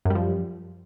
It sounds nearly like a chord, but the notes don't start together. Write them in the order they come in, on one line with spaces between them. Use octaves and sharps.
F#2 G3 F3